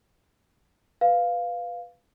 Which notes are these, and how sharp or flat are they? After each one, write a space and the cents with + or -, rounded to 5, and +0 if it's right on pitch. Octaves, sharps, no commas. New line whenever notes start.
B4 +0 F5 +0